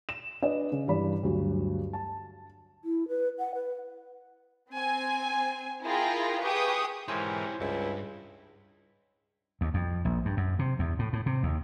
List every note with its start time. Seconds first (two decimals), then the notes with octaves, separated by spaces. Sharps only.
0.09 E7
0.42 D4 B4 D5 D#5
0.72 C#3
0.88 G2 E3 D5 B5
1.23 D2 G2 F#3 F#4
1.93 A5
2.85 E4
3.08 B4
3.39 F#5
3.55 B4
4.72 C4 G#5
5.85 E4 F4 G#4 A#4 G5 A#6
6.42 G4 G#4 B4 G5 C#6 D#6
7.08 G#2 E3 E4 G4 A#4 C5 C#5 G#5
7.60 C#2 G2 D4 E4
9.61 D#2
9.74 F2
10.05 A#1
10.25 G2
10.37 F#2
10.59 C3
10.79 E2
10.99 A2
11.13 A2
11.26 C3
11.43 D#2